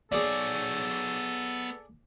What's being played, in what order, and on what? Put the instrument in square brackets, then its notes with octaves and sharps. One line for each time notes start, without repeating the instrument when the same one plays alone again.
[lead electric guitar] B3 C#5 [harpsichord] G#4 D5 [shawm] A4